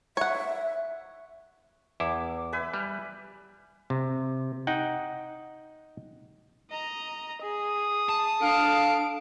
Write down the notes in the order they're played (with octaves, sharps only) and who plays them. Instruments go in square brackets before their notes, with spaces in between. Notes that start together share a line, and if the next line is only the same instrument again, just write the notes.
[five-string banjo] C#5 F#5 [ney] E5
[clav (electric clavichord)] E2 E4 [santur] D6
[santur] B4 E5 G#5
[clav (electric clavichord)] G3
C3
D#4 F#5 G5
[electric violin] D#5 A#5
[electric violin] G#4 [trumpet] D#6
[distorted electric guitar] A5
[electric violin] D4 D7 [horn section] A4 F5